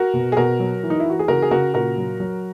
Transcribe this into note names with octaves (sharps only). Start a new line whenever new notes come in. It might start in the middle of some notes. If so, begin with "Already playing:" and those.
Already playing: F#4 A#4
B2
G#4
B2 F#4 A#4
F#3
E3
D#4
E4
E3 F#4
G#4
C#3 F#4 A#4
G#4
C#3 F#4 A#4
A#2 F#4 A#4
F#3
F#3